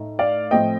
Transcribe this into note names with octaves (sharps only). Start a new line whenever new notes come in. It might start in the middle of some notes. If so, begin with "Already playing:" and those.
Already playing: A2 A3 D#4
D5 F5
A2 F3 A3 C4 D#5 G5